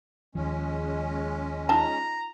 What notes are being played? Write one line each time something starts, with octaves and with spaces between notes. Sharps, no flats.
D#2 F3 G#3 C#4
D#4 F4 A5 A#5